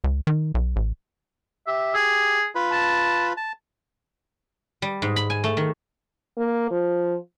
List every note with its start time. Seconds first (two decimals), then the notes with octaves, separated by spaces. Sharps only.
0.04 C#2
0.27 D#3
0.54 B1
0.76 A1
1.67 G4 E5
1.94 G#4
2.55 F4 B4 B5
2.72 A5
3.37 A5
4.82 G3
5.02 G#2
5.16 B5
5.30 G#5
5.44 A3
5.57 D#3
6.38 A#3
6.71 F3